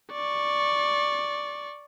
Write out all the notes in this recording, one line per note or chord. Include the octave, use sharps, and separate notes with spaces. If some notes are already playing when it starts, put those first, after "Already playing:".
D5 C#6